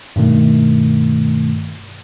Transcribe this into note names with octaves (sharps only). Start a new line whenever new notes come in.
G2 B2 D#3 A3